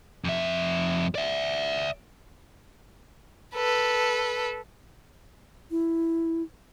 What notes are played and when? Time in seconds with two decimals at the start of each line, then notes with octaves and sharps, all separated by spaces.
0.25 F2 E5
1.15 D5 E5
3.55 A4 B4
5.71 E4